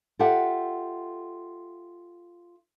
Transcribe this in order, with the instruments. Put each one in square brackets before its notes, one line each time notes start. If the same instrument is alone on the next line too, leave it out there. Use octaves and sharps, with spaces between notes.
[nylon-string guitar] F4 G4 A4 E5 F#5